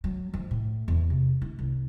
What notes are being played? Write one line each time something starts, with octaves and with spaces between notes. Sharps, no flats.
F#3
F3
A2
E2
C3
E4
C2